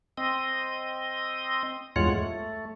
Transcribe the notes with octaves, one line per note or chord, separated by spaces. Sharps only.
C4 D#5
E2 G2 G#3 F4 C#5 F#5
A3